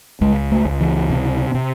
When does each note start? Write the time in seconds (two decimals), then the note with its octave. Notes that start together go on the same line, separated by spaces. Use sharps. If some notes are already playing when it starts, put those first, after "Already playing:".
0.21 C#2 G#3
0.52 A3
0.65 C#2
0.81 E3
1.10 C3
1.54 C3